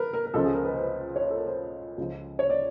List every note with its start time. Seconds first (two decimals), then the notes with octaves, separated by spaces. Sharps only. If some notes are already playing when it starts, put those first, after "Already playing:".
Already playing: A#4 B4
0.13 A#4
0.26 A#4
0.34 C#2 C#3 F3 A4
0.45 G#4
0.55 A#4
0.65 B4
0.73 C5
0.81 B4
1.16 C#5
1.31 A4
1.36 A#4
1.47 C5
1.98 C#2 C#3 F3
2.39 C#5
2.50 D5